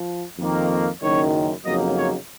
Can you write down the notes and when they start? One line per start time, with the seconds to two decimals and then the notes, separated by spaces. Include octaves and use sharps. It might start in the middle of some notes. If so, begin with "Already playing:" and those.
Already playing: F3
0.37 F2 D#3 A#3
1.01 F#1 F#2 D#3 C#5
1.65 F2 C#3 F#3 A#3 D#4 D#5
1.97 C#5